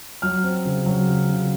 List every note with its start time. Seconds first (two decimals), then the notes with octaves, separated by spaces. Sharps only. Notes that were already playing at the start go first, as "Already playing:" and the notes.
0.22 F#3 F6
0.44 C4
0.66 C#3
0.86 F#3
1.08 C#3
1.29 C#3